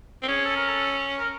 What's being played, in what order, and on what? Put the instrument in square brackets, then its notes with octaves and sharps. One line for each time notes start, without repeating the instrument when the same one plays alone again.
[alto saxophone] C4
[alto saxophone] C#4 [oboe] G#4
[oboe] A4
A#4
A4
A#4